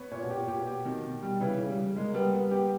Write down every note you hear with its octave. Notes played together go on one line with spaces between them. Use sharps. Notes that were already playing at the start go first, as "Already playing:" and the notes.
Already playing: B3 C#5
A#2 C#5
B2
A#2 G4
A#2 G4
B2
G4
B2 D#3
B2
G3
C#3 E3
C#3
G3
C#3
G#3 A#3
G3 B3
G3 B3
B3 G4